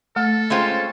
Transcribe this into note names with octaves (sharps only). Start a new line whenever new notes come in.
A3 A4
G#3 C4 C#4 F4 C5 C#5